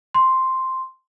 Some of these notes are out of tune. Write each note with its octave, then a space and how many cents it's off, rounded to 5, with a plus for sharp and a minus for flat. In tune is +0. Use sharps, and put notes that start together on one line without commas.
C6 +0